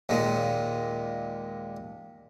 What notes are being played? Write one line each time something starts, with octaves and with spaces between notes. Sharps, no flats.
D#2 A#2 G#3